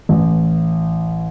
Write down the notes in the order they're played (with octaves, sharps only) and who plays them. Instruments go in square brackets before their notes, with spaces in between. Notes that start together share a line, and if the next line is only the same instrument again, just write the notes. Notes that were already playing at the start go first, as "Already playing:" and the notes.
[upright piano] A1